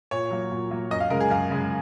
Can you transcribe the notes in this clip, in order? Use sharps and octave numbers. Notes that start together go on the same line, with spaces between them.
A#2 C#5
F#3 A#3
A#2
F#3 A#3
F#2 D#5
F5
C#3 G#3 A#4
G#4
F#2 F5
C#3 G#3